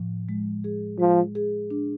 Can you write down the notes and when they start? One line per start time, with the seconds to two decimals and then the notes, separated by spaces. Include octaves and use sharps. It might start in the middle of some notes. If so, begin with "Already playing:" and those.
Already playing: A2 F3
0.29 G#3
0.64 G#4
0.99 F3 G#3
1.35 G#4
1.71 D4